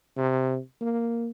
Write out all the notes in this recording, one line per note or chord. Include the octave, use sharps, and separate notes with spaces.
C3
A#3